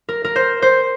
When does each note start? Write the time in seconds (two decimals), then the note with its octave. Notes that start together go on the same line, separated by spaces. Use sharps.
0.09 A#4
0.24 A#4
0.36 C5
0.62 C5